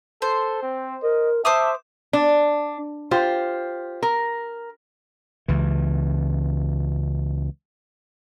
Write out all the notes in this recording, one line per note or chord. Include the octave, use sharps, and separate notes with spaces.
A4 C5
C4
A#4 D#5
C5 E5 A5 D6 D#6
D4
F4 G4 C5
A#4
C#2 E3